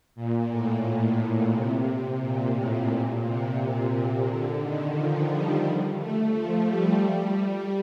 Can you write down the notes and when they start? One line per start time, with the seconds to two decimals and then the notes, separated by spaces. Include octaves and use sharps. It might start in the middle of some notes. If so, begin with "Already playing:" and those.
0.15 A#2
0.49 A2
0.84 A#2
1.52 C3
1.87 C3
2.21 A#2
2.55 A2
2.89 A#2
3.23 C3
3.92 C3
4.26 D3
4.61 D#3
4.95 F3
5.29 G3
5.98 A3
6.32 F3
6.67 G3
7.01 G3